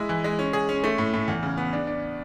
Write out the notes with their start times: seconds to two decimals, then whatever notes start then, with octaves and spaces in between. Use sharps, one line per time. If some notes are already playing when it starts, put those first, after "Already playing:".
Already playing: G#3 E4
0.09 E3
0.24 G#3
0.39 C#4
0.53 G#4
0.69 C#4
0.84 A3
0.98 A2
1.13 A2
1.28 E2
1.43 C#3
1.57 B3
1.73 D4
1.87 D4